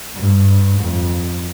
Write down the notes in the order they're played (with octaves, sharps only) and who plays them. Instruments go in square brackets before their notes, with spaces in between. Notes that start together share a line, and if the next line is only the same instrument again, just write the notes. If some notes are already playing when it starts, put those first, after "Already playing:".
[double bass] G2
F2